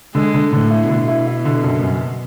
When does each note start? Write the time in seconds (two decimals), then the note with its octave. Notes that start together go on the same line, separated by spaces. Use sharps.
0.15 D3 G#3
0.34 D3
0.52 A2 D3
0.70 E4
0.89 B2 D3
1.08 E4
1.27 E4
1.45 D3
1.63 F#1
1.82 F#2